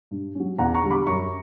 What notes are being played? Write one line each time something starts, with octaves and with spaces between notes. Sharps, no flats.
G2
F#3 C#4
E2 F#5 A#5
A#5 C#6
D3 G3
B5 D6
F#2 A#5 C#6